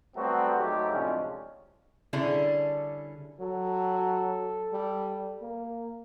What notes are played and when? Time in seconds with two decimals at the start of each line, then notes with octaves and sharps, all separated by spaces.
0.15 F#3 G3 A3 B3 C4 F#4
0.58 G#2 F#3 A3 D#4 G4
0.91 A2 C3 F3 G#3 C#4 D4
2.13 D3 G3 C#4 D4 E4 G#4
3.40 F#3 A4
4.73 G3
5.42 A#3